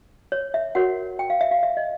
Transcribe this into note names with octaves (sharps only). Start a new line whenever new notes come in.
C#5
E5
F#4 A#4 C#5 F#5
G5
F5
E5
F5
E5
D#5